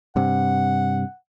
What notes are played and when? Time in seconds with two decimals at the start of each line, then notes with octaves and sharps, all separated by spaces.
0.16 G2 C3 F#5